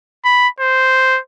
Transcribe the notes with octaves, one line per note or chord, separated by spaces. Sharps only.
B5
C5